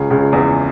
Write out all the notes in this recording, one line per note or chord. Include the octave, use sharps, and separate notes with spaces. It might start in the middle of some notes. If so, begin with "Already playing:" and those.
Already playing: C#2 C#3
C#2 C#3
E2 E3